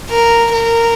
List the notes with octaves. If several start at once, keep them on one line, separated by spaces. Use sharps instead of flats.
A#4
A#4